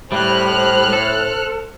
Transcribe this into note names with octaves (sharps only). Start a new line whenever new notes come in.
A2 G3 C5 F6 F#6
A4